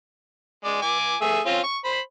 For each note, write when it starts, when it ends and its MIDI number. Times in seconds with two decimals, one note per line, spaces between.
0.64 0.81 56
0.64 0.81 74
0.82 1.16 80
0.82 1.16 86
1.21 1.40 57
1.21 1.40 68
1.21 1.40 76
1.46 1.59 60
1.46 1.59 61
1.46 1.59 65
1.64 1.78 85
1.85 1.99 72
1.85 1.99 83